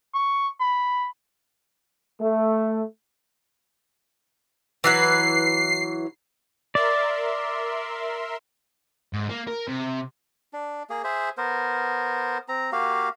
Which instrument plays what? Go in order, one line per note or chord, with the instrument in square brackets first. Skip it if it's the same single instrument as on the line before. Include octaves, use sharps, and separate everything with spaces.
[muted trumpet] C#6
B5
[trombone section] A3
[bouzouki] E3 F#3 B4 [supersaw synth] C7
[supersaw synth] A#4 E5 C6 [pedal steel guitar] D5
[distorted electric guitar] G#2
A#3
A#4
C3
[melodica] D4
A#3 G#4
G#4 C5 E5
B3 A#4 C5
C4 A#5
A#3 F#4 G4 F5